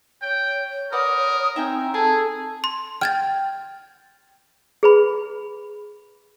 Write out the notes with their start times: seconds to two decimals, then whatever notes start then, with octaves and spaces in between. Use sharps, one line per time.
0.22 C#5 G5
0.92 A#4 B4 D5 F#5 D#6
1.56 C4 D#4 E5 G5 G#5
1.94 G#4 A4 G#5 A5
2.64 C6
3.01 G5 F6 G#6 A6
4.83 G#4 B4 B5